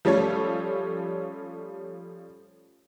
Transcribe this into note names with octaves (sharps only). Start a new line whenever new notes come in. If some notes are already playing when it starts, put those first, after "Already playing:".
F3 G3 A3 C#4 A4 C#5